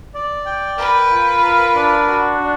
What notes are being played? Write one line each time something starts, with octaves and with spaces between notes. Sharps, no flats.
D5
G5
A#4 B4
F4
A#4
D4
F#4
D4